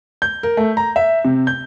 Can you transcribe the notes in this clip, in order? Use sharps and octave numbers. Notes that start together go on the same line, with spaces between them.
G6
A#4
A3
A#5
E5
C3
G6